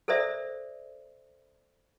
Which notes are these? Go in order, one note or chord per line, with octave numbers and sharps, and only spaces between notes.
A4 A#4 C5 D5 E5